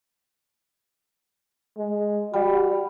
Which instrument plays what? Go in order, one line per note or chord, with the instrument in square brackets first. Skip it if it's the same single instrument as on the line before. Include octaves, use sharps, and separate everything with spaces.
[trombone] G#3
[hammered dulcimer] G3 [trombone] F#4